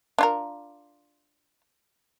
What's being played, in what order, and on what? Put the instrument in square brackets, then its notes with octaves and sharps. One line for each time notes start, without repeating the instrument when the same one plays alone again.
[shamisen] D4 F4 A#4